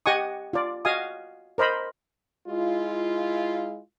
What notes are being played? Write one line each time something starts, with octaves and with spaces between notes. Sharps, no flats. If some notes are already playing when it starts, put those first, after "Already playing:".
G4 D#5 F#5 G#5 C#6 D#6
F4 D5
F#4 D#5 F5 G#5 D#6
A#4 C5 D#5 B5
G#3 E4 F4